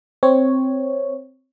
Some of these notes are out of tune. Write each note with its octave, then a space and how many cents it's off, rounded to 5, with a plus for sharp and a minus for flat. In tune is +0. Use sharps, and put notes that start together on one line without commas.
C4 +0 C#5 +0